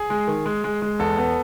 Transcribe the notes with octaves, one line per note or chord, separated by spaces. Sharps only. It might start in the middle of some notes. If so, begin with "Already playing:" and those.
Already playing: G#4
G#3
D#3
G#3
G#3
G#3
E2 A4
B3